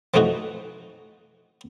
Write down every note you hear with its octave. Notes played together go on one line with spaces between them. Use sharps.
E3 F3 A3 D#4 F#4